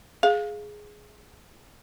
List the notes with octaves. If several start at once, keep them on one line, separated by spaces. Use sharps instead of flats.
G#4 F5